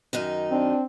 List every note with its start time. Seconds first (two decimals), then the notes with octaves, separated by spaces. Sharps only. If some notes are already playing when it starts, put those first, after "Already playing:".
0.13 F#2 D#3 D#4
0.51 C4 D4